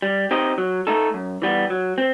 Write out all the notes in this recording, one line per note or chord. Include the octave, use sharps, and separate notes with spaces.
G3
C4 D#4 G4 D#5
F#3
A3 D#4 A4
F#2
E3 G3 B3
F#3
C4